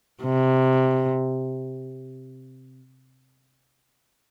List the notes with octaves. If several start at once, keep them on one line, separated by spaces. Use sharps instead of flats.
C3